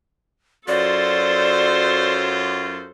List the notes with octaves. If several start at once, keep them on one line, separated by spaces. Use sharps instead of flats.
F#2 F#3 F4 A4 C5 D5